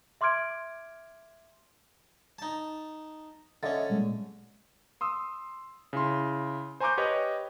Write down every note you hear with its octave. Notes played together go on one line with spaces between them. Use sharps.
E5 C6 D6 F6 G#6 D7
D#4 A5
D3 C#4 D#5 E5 A6
A#2 G3 G#3
C6 D#6 E6
C#3 E4 C6
C5 G#5 A#5 C#6 D6 G6
G4 B4 C#5 D#5